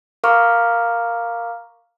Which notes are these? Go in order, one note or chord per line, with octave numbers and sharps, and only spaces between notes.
A#4 F5 A#5 C#6 D6 F6